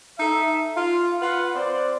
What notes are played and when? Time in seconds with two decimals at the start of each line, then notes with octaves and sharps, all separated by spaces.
0.19 D#4 A4 E5
0.76 F4 F5
1.22 F4 B4 F#5
1.55 C4 C5 D5